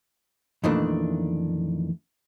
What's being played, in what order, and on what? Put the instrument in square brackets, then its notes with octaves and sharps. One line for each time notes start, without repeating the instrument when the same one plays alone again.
[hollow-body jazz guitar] F2 A#2 D#3 E3 A3 D4